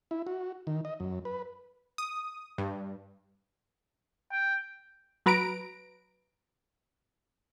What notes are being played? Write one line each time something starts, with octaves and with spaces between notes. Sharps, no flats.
E4
F#4
D#3
D#5
F#2
B4
D#6
G2
G5
F#3 B4 A#5 D7